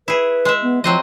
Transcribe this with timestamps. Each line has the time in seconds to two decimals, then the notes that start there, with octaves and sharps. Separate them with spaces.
0.08 E4 G#4 B4
0.45 G#3 E5
0.62 B3
0.84 F3 F#3 C4 D#5